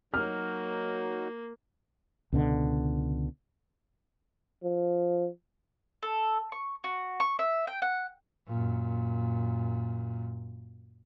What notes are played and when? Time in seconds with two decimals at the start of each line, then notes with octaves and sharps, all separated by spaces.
0.14 F#3 A#3 D#4 F#4 F6
2.32 C#2 B2 D3
4.64 F3
6.03 A4
6.52 C#6
6.84 F#4
7.20 C#6
7.39 E5
7.67 G5
7.82 F#5
8.48 F#2 A#2